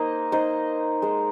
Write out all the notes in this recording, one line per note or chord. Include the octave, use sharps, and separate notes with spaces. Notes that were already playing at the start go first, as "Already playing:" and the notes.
Already playing: A#3 D#4 C5 D#5
D#4 C5 D#5
G#3 D#4 C5